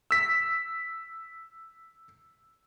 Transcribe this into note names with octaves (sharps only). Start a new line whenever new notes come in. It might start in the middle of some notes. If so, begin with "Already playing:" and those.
E6 B6